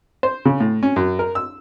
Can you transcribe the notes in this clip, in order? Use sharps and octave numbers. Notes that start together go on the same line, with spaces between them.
C5
C#3
A2
C#4
F#2
A#4
E6